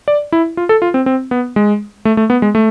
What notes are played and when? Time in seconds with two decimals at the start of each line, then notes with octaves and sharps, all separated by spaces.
0.08 D5
0.32 E4
0.57 F4
0.69 A4
0.82 F4
0.94 C4
1.06 C4
1.31 B3
1.56 G#3
2.05 A3
2.17 A3
2.30 B3
2.42 G#3
2.55 A3